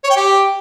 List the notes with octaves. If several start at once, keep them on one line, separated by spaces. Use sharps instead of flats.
C#5
G5
G4